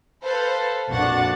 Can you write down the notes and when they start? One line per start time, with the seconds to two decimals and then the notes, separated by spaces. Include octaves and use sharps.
0.23 A4 B4 C5 F5 A5
0.90 A#1 F2 D4 F#4 F#5 A6